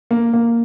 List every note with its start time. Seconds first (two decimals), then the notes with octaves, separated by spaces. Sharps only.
0.11 A#3
0.33 A#3